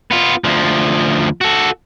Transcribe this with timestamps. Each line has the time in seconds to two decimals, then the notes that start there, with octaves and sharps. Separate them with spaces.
0.11 B3 F4
0.44 D2 F3
1.41 F#4 A4